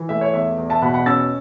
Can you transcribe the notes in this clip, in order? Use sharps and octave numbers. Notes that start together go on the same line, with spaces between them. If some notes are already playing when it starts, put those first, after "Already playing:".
Already playing: E3
A3 E5
C#5
E2 E5
E2
E5 A5
B2 F#5 B5
F#5 B5
C#4 E6 A6